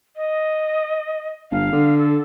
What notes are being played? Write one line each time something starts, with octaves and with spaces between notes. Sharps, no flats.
D#5
G1 F5
D3
A4